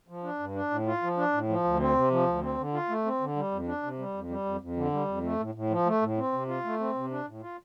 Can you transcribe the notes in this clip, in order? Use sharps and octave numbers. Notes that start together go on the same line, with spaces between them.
F3
D4
G2
D4
A2
F4
F3
D4
A2
F3
D2
C4
C3
F3
D2
C4
D3
F4
A3
C4
D3
G3
F2
D4
C3
G3
F2
G3
F2
F2
D3
G3
F2
A3
A2
A2
F3
A3
A2
C4
C3
F4
A3
C4
C3
D4
A2
F4